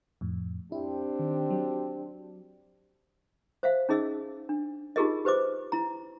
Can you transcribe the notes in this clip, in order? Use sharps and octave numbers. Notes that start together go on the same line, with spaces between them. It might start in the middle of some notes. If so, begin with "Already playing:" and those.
F2 A2
C4 D4 E4 G4
D#3
F#3
C5 E5 F5
C#4 D#4 G#4 D#5 E6
D4
D#4 F4 G4 G#4 A#4 D#5
G4 B4 C5 D#5 D6
E4 A#5